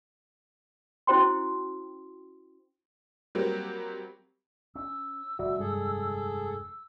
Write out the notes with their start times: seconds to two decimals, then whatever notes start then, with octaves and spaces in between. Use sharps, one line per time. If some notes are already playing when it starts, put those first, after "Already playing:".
1.07 C#4 E4 F#4 C5 G5 C6
3.35 F#3 G3 A#3 C4 G4
4.76 C#4 E6
5.39 F1 D3 G3 F#4 D5 E5
5.59 G2 G#3 G#4 A4